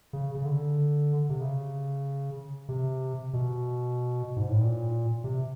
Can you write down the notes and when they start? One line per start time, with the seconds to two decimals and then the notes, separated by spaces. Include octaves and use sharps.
0.13 C#3
0.35 C#3
0.45 D3
1.29 C3
1.41 C#3
2.69 C3
3.33 B2
4.37 G#2
4.49 A2
4.61 A#2
5.24 C3